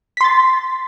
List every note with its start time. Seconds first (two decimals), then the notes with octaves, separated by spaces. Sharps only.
0.17 B6
0.21 C6
0.24 A6